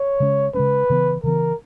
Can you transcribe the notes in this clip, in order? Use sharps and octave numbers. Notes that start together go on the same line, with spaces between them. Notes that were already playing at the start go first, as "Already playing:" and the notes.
Already playing: C#5
C#3 G#3 C#4
C#3 G#3 C#4 B4
C#3 E3 B3
C#3 E3 B3 A#4